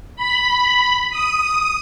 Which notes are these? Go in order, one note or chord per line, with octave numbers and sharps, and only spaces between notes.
B5
D#6